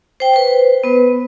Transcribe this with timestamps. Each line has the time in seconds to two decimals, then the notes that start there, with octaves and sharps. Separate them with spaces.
0.20 C5 G5
0.33 B4 C5
0.84 B3 B4